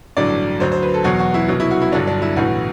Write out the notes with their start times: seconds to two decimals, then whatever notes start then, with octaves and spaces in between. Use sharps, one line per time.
0.17 A1 G2 D3 F#3 D5
0.60 D2 D3 F#3 C5
0.72 C5
0.82 B4
0.94 A4
1.04 E2 B2 F#3 F#4
1.19 F#4
1.34 E4
1.48 C2 B2 F#3
1.60 E4
1.71 F#4
1.82 E4
1.92 G1 G2 D3 F#3 D4
2.07 D4
2.22 E4
2.36 B1 A2 E3 F#4